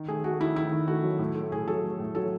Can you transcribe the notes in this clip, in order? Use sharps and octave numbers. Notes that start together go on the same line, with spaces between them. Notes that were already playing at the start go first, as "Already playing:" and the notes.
Already playing: D#3
A3 G#4
A3 F#4
D#3 E4
D#3 E4
D#3
A3 F#4
F#3
A2
A3
A2 G#4
F#3 A4
A3
A2
F#3 A4